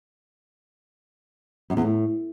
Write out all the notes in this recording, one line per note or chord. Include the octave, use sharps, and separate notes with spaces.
F#2
E2
A2